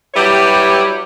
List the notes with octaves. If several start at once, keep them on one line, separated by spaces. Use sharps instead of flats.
F#3 G3 E4 G4 B4 C#5